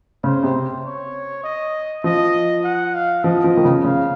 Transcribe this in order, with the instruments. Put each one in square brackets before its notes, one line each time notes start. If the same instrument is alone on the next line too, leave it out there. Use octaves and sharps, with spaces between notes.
[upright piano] C#3 [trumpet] C5
[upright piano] C3
[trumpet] C#5
D#5
[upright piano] F3 [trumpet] D#5
[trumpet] F#5
F5
[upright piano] F3 [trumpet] D#5
[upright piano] F3
D#3
C#3
[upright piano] C#3 [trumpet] F5